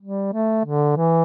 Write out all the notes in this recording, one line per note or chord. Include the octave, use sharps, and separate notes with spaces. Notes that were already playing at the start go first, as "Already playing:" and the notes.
G3
A3
D3
E3